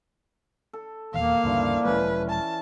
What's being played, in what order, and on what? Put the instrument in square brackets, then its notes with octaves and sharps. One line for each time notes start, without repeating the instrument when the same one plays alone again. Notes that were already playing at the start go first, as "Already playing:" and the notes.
[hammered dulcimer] A4
[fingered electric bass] D#1 E2 [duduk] A#3 [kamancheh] F5
[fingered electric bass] D2 G2 C#3 [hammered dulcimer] E3 F3 D5
[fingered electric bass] E1 F3 G#3 [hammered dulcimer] E3 C#4 [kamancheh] B4
[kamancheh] A5